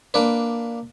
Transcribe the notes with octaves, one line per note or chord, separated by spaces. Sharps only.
A#3 D4 B4